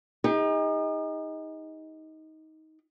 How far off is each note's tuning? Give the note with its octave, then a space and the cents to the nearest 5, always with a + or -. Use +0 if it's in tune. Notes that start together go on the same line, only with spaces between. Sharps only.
D#4 +20 G#4 -45